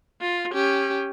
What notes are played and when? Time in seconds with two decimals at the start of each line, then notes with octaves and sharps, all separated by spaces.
0.21 F4
0.53 C#4 G4